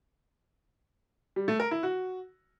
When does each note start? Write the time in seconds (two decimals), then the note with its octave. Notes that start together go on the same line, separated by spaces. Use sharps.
1.36 G3
1.48 A3
1.60 A#4
1.71 E4
1.83 F#4